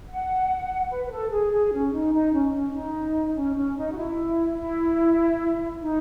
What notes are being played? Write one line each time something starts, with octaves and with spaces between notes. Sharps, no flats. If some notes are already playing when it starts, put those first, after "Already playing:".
F#5
B4
B4
A4
G#4
G#4
C#4
D#4
D#4
C#4
C#4
D#4
C#4
C#4
D#4
F#4
E4
E4
D#4